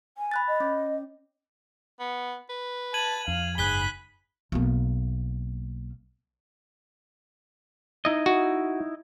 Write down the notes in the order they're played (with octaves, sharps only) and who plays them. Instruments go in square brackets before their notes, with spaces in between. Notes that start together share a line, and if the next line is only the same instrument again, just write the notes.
[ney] G#5
[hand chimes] B5 F#6 A6
[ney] D#5
[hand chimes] C#4
[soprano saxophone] B3
B4
[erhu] A5 [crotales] G#6 D#7 F#7
[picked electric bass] F2 [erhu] F5
[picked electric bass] F#1 G#2 [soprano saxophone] G#4 [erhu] B5 [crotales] F#6 B6 G7
[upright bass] B1 A#3
[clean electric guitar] D#4 E4 D#5
[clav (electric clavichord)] F#4